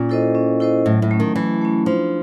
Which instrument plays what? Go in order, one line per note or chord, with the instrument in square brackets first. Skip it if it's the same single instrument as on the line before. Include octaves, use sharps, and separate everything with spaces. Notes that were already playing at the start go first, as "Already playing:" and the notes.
Already playing: [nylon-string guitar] A#2 [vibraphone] C#4
[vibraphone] E4 A4 C5 D#5
C#4
E4 A4 C5 D#5
[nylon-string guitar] A2 [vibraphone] F#3
[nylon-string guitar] A2
[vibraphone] A3 C#4
[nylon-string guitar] D#3
[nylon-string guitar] E3 [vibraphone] F#3
[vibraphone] A3 C#4
[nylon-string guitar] F3 [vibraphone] D4